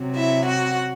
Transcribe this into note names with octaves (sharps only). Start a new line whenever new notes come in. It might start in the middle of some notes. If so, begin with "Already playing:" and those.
Already playing: C3 F#3
E4 E5
F#4 F#5